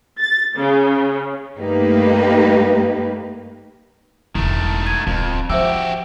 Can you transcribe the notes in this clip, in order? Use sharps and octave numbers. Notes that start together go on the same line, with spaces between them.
A6
C#3
G2 A3 A#3 D#4 G4 B4
E1 D#3 A3 E4
G#6 D#7
D1 F2 C4
F3 F#4 G4 C5 E5 E6